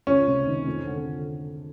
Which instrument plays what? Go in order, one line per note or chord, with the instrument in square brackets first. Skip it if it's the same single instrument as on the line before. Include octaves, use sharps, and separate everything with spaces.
[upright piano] C#2 [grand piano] C#4
[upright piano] C3
D#3
F2
D3